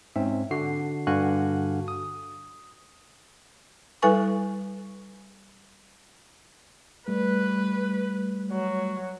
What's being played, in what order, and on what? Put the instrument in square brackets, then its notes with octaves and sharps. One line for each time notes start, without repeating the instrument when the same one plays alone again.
[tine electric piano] G#2 C4 C#4 E5
D3 F#4 C7
G2 D3 F#4 F5 G#5 F#6
D#6
[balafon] G3 E4 A4 B4 G#5 C#6
[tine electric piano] G3 A3 [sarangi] B4
[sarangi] F#3